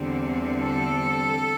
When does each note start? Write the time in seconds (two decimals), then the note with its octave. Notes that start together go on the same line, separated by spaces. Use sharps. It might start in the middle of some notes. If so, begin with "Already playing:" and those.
Already playing: E2 D3 G3 C4
0.62 A4